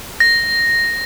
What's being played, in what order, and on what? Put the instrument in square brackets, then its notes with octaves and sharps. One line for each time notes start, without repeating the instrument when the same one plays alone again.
[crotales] A#6